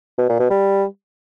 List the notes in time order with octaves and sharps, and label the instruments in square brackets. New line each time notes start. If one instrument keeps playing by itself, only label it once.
[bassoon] B2
A#2
B2
G3